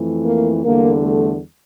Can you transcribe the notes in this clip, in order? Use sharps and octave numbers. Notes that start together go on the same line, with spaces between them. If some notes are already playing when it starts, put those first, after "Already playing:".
Already playing: F2 E3 A3
A#3
E2 D3 G3 A#3
A3